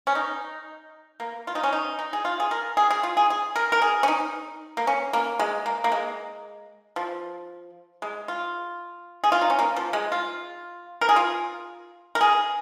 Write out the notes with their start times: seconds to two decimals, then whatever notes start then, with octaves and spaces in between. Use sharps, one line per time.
0.07 C#4
0.15 D#4
1.20 A#3
1.47 F4
1.55 D#4
1.63 C#4
1.73 D#4
1.99 D#4
2.13 G#4
2.25 F4
2.40 G#4
2.51 A#4
2.77 G#4
2.90 G#4
3.03 F4
3.17 G#4
3.30 G#4
3.56 A#4
3.72 A#4
3.82 G#4
4.03 C#4
4.08 D#4
4.77 A#3
4.87 C#4
5.13 A#3
5.39 G#3
5.66 A#3
5.84 A#3
5.92 G#3
6.96 F3
8.02 G#3
8.28 F4
9.24 G#4
9.32 F4
9.41 D#4
9.50 C#4
9.59 A#3
9.76 F3
9.93 G#3
10.12 F4
11.01 A#4
11.09 G#4
11.16 F4
12.15 A#4
12.21 G#4